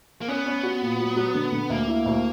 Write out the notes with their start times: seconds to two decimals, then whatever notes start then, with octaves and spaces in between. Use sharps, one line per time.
0.21 A#3
0.28 B3 C#4
0.46 C#4
0.63 F#4
0.82 A#2
0.99 F#3
1.16 F#3
1.35 D3
1.52 D3
1.70 D2 A#3
1.88 E4
2.06 D2